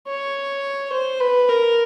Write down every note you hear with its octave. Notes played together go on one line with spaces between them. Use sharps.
C#5
C5
B4
A#4